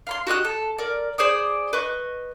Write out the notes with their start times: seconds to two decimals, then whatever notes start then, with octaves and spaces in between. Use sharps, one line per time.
0.07 F5 B5 C6
0.27 F#4 G4 D#5 F#6
0.45 A4
0.78 A#4 D5
1.18 G#4 C5 D5 D#6
1.73 B4 D#5 C#6